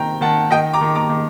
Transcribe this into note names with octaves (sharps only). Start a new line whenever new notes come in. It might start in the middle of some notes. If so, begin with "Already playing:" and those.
Already playing: C3 D#3 G5 A#5
D#3 F#5 A5
D#3 D#5 G5
A#5 D6
D#3
A#5 D6
D#3